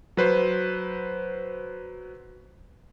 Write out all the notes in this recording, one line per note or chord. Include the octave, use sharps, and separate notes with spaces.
F#3 B4 C5